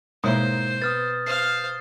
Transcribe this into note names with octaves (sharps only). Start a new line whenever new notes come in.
G#2 B2 A#3 E4 C5 C#5
B3 D#6 F6 A6
C5 F5 C7